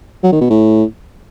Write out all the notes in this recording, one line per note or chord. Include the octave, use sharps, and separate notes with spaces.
F#3
D#3
B2
A2